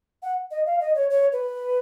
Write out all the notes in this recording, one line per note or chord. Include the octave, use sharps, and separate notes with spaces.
F#5
D#5
F5
D#5
C#5
C#5
B4